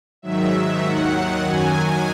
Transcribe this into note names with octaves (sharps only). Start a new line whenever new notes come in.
G#2 D#3 F#3 E5
D#2 D#3 F#3 F#5
F#2 D#3 F#3 G#5